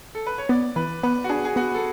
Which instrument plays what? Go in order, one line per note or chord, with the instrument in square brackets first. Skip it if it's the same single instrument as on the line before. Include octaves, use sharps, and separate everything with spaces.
[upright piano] A4
B4
C#5
[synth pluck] B3 [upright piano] D5
[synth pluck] E3 [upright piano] B4
[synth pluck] B3 [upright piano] B4
[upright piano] F#4
[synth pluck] D4 [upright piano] G#4
[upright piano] G#4
[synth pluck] B3 [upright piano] F#4
[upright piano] A4